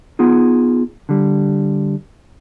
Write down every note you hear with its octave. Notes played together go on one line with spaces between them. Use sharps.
B3 D#4 F4 G#4
D3 G3